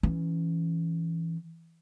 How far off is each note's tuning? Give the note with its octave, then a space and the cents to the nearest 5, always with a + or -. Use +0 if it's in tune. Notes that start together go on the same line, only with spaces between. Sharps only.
E3 +0 C#4 +5